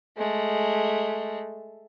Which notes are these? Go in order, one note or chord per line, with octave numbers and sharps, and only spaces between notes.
G#3 A3